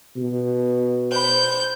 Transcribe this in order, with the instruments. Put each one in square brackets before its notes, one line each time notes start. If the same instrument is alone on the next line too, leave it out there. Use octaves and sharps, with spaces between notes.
[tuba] B2
[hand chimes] C5 B5 [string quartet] G6